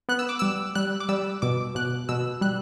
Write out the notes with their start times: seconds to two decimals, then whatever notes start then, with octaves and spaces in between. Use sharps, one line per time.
0.09 B3 F#6
0.19 E6
0.29 D6
0.39 G3 E6
0.75 G3 F#6
1.00 D6
1.09 G3 E6
1.42 B2 D6
1.75 B2 F#6
2.09 B2 E6
2.41 G3 F#6